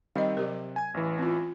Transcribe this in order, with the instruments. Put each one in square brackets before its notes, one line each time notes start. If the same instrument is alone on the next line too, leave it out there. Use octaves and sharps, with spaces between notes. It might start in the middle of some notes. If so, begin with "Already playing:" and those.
[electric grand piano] D#3 G3 C4 [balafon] D#5 F5
[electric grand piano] C3 [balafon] F#3 G4 A#4
[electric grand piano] G#5 G#6
A1 E3
[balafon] C4 F4